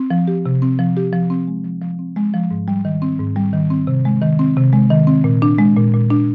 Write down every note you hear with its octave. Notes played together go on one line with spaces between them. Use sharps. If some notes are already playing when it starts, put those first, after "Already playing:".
Already playing: C4
F3
G4
C3
C4
F3
G4
F3
C4
G#3
F3
F3
C4
G#3
F3
G#2
G3
D#3
C4
G#2
G3
D#3
C4
C3
G#3
D#3
C4
C3
G#3
D#3
C4
A#2
D4
G#3
A#2
A#2
D4